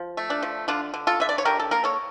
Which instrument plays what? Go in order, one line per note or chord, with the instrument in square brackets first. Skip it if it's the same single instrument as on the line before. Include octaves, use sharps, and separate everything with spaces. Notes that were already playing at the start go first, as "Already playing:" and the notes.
Already playing: [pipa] F3
A3
D4
F3
D3 D4 F4
D3
F4 A4
D3 E5
D5
C#5
D3 G4 A#4
A4
A#3 A#4
A4 C#5